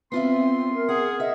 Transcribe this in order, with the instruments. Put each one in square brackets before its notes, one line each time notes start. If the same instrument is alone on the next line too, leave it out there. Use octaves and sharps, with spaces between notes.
[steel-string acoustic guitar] B3 F4 E5 [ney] C4 [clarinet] C6
[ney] A#4
[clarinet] G#4 [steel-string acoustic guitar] F#5
[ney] D#5 [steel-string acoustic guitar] E5